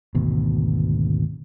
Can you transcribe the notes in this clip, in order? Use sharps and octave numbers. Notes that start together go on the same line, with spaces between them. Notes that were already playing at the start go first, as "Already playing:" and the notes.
G#1 D2 B2